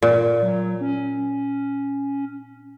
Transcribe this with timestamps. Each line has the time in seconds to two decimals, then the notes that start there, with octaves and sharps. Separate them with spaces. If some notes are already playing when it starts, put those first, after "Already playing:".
0.02 A#2
0.43 F#3
0.81 C#4